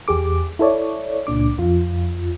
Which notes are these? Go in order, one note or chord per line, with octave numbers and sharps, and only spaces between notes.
E2 G4 G#4 D6
E4 A4 C#5 D5
C#2 A#2 D4 D6
F2 F4